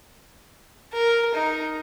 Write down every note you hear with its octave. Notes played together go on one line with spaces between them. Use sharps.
A#4
D#4